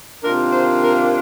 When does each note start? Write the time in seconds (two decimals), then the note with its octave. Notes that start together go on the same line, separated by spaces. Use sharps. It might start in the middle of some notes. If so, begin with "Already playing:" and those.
0.22 C3 D#3 A#3 D4 F4 A#4
0.52 C5
0.84 A#4